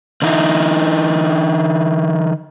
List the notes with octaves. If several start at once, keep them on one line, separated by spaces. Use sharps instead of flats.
D3 E3 D#4 E4